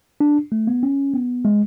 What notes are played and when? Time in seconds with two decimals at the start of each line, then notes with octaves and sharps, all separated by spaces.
0.20 D4
0.52 A3
0.67 B3
0.83 C#4
1.14 B3
1.45 G#3